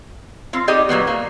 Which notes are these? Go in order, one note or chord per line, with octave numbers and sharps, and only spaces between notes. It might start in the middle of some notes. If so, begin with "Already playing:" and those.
C4 F4
D#4 G4 D5 D#5
A#2 F#3 G3 B3
A#3